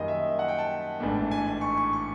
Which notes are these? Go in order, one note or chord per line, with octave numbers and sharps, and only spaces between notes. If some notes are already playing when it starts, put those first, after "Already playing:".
Already playing: F#2 D#3 G3 A#3 D#5
E5
F#5
G5
A5
A1 G#2 E3 A3 D4
G#5
C#6
C#6
C#6